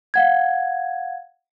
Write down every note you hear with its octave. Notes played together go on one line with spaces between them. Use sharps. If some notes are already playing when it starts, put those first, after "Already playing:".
F5 F#5 G#6